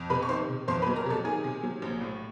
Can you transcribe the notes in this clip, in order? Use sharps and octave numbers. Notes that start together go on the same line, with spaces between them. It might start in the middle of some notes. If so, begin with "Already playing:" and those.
Already playing: F2
C3 B4 B5
C#6
D#3 C5 C6
C3
F2 C5 C6
B4 B5
F#3
A#4 A#5
C3 A4 A5
D#3 G#4 G#5
C3
F#3
A#1
A2